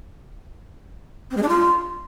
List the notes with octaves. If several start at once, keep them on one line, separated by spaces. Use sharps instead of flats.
C4
G#3
D4
F4